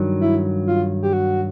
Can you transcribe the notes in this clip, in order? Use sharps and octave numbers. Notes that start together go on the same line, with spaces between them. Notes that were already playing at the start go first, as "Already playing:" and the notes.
Already playing: G2 D#3 F#3
E4
F4
G4
F#4